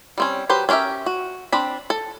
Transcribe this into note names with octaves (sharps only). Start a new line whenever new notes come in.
G3 C4 C#4
F#3 G4 B4 C5
C#4 D4 G4 A#4 E5
F#4
C4 D4 B5
A4